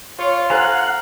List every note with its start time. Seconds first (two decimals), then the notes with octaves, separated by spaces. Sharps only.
0.19 F4 C#5
0.50 A4 C5 F5 F#5 G#5 A#5